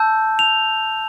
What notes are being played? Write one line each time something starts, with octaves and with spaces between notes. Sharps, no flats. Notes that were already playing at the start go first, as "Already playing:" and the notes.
Already playing: A5 E6 G6
F7